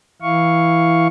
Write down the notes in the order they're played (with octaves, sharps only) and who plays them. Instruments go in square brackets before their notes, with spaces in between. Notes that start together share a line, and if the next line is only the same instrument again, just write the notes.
[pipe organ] E3 E4 F5 C#6